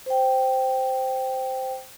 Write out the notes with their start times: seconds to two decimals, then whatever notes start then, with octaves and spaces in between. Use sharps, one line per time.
0.06 C5 G5